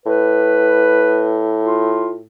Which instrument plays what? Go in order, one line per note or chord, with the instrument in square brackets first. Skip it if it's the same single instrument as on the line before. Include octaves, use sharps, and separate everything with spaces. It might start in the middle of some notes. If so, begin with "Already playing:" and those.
[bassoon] A2 [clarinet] B4
[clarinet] F4